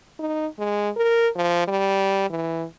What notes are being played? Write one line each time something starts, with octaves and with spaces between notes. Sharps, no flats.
D#4
G#3
A#4
F3
G3
E3